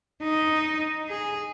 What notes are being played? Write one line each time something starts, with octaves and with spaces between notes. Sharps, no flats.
D#4
G#4